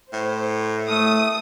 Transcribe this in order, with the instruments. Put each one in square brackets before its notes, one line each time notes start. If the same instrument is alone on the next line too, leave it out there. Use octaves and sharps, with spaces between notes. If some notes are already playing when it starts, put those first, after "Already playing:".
[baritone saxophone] A2 [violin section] C5
[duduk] A3 [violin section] D#6